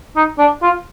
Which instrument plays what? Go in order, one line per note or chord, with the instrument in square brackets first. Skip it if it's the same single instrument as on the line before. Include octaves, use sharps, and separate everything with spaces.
[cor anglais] D#4
D4
F4